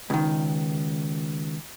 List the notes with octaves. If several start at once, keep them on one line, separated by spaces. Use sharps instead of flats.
C#2 D#3